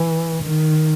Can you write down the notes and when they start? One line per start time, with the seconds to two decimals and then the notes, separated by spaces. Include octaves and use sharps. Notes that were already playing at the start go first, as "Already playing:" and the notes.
Already playing: E3
0.43 D#3